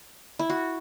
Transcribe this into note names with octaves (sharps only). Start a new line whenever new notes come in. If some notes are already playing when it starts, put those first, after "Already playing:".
E4
F#4